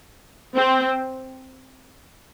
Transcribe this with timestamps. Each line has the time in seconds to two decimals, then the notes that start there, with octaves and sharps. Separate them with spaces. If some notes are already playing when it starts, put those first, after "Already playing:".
0.55 C4